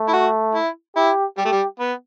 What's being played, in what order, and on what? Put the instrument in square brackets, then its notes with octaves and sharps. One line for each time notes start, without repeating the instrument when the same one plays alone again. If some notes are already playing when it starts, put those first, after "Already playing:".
Already playing: [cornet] A3
[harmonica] E4
F#4
E4
[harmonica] E4 [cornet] G4
[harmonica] G3 [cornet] G4
[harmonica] A3
G3
B3